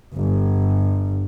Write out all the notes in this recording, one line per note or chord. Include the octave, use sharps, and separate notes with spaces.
G1